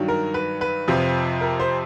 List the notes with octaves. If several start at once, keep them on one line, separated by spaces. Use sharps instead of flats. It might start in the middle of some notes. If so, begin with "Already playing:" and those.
Already playing: G2 D#3 F#3
A#4
B4
B4
F2 C3 F3
A#4
C5